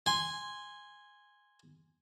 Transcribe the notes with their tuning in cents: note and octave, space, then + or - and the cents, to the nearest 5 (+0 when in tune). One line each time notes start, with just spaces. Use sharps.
G#5 -10 C6 +0